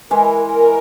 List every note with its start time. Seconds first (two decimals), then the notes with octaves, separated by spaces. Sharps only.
0.11 E3 G#3 E4 A#4
0.47 A#4